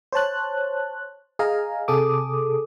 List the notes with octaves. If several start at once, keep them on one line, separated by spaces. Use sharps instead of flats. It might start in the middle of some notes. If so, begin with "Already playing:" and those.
C5 C#5 A5 F#6
G#4 D#5 F5 G#5 A#5
C3 G#4 A4 D6 D#6